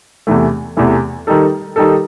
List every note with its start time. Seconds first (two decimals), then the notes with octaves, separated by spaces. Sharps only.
0.27 E2 C3 E3 A3
0.77 E2 C3 E3 A3
1.27 D#3 G3 D#4 A4
1.76 D#3 G3 D#4 A4